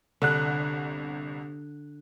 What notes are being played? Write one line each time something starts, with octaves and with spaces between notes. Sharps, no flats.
G1 C2 D3 F#6